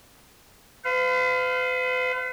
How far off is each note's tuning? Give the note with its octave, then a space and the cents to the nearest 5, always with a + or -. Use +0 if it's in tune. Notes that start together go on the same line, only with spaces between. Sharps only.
B4 +45 F5 +0